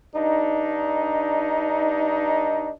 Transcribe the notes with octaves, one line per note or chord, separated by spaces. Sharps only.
G2 D4 D#4